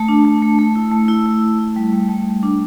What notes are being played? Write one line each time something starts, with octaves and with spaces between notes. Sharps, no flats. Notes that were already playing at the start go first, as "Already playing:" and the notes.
Already playing: A3 A5
D4
A3
A3
A3
E4
A3
E4
E4
E4
E4
G3
A3
A3
A3
D4